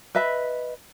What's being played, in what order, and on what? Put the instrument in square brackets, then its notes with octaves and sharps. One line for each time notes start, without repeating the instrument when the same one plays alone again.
[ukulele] B4 D#5 E5 B5